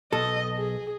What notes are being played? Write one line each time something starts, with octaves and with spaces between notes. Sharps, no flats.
B1 A4 D#5
G#4